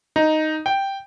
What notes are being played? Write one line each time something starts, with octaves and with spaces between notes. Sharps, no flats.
D#4
G5